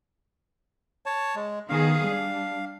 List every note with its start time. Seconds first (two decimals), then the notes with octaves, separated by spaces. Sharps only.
1.06 C#5 A5
1.35 G#3
1.69 D#3 B3 G#4 F5
2.07 G3 D4